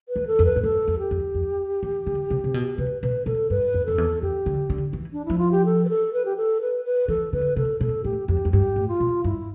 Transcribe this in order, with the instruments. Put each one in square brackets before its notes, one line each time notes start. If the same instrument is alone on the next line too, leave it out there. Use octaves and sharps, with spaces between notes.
[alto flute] B4
[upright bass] E2
[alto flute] A4
[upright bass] F2
[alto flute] B4
[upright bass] A2
[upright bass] G2 [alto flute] A4
[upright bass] F2
[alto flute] G4
[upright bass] F2
F2
E3
D3
C3
C3
B2
[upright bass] C3 [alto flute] B4
[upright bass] B2 [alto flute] B4
[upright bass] B2 [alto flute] A4
[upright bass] G2 [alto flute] B4
[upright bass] F2
[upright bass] F2 [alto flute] A4
[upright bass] E2
[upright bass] F2 [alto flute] G4
[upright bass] D3
D3
E3
[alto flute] D4
[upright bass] F3 [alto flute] E4
[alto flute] F4
G4
A4
B4
A4
B4
G4
A4
B4
B4
[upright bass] E3 [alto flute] A4
[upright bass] D3 [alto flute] B4
[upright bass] C3 [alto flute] A4
[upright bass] B2 [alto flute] A4
[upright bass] A2 [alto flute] G4
[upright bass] F2 [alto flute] G4
[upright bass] F2
[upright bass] G2 [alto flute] G4
[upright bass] A2
[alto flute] F4
[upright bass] B2
[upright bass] G2 [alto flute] E4